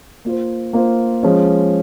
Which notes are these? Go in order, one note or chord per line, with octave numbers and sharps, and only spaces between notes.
A#3 F4 C5
A#3 F4 C5
F3 G#3 C#4